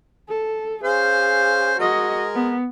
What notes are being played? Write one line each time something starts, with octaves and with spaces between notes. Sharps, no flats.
A4
C#4 G#4 C5 F5
G#3 F#4 A#4 D#5
B3